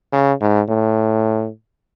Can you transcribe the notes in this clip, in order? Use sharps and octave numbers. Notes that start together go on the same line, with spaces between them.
C#3
G#2
A2